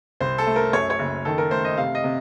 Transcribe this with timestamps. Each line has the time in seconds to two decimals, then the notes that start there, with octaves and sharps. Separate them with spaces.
0.20 C2 C5
0.38 A4
0.47 A3
0.56 A#4
0.73 F#2 C#5
0.90 C#5
0.99 F#1
1.25 D#3 A4
1.38 A#4
1.51 A3 C5
1.65 D#5
1.77 C3 F5
1.95 D#5
2.04 C3